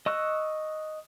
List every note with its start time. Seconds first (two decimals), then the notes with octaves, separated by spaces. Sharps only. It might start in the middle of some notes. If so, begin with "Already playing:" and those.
0.06 D#5 C#6 E6 F#6